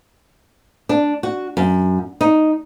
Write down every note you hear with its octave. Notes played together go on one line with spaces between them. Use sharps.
D4
F#4
F#2
D#4